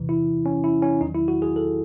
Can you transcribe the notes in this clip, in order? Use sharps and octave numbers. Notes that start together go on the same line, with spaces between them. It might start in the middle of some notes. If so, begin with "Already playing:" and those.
Already playing: E2 C3 E3
E4
C#4
E4
C#4
E2 D#3 F#3 D#4
E4
F#4
G#4
A4